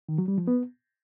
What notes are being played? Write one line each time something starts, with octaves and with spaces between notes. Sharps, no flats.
D#3
F#3
G3
F3
B3